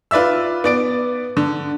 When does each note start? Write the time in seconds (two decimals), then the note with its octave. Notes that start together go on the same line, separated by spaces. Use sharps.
0.11 F4 B4 D5 E5 E6
0.64 B3 D5 D7
1.37 D3